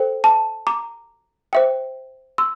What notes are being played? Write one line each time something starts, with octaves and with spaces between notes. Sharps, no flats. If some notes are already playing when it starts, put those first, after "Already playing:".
Already playing: A4 C5 G5
A5
A#5 D6
C5 E5 G5
C6 E6